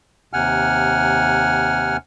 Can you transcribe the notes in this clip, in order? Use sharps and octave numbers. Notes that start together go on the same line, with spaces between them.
D#2 C3 F#5 G#5 F6